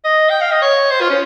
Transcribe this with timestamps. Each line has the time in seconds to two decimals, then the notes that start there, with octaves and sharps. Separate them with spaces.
0.05 D#5
0.30 G5
0.41 F5
0.52 D#5
0.62 C#5
0.91 C5
1.01 F4
1.10 C#4